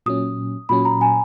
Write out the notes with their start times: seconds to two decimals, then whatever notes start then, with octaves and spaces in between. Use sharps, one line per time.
0.06 A#2 F#3 C#4 D#6
0.69 A#2 F#3 C#4 B5
0.85 A#5
1.01 G#5